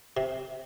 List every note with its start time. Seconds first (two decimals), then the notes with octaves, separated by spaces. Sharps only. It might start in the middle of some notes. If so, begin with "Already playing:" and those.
0.17 C3